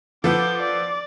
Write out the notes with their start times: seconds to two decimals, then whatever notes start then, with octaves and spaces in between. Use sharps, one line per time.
0.24 F3 A4 B4 F#5 D6 G6
0.60 D5